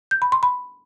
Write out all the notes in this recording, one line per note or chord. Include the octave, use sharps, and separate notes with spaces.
G6
B5
C6
B5